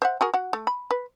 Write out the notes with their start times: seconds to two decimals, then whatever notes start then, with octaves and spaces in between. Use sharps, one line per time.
0.02 C5 E5 F#5
0.21 F#4 G#4 A#4
0.34 F#4 F#5
0.53 A3
0.67 B5
0.91 B4